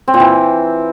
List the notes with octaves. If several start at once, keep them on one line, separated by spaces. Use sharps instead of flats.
C4
A#2
E3